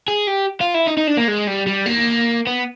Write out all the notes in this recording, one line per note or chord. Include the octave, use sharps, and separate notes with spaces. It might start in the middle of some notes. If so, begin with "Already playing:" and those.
G#4
G4
F4
E4
D#4
D#4
D4
A#3
G#3
G3
G3
A#3
B3